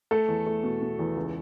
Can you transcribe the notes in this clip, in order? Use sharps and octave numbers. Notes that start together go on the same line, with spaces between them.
A3 A4
E2
A3
B2
B2
E2
C#2